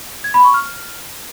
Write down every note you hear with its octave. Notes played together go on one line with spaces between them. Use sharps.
G#6
B5
C#6
F6